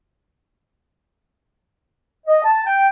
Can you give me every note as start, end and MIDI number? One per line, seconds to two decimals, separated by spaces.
2.27 2.42 75
2.44 2.65 81
2.66 2.88 79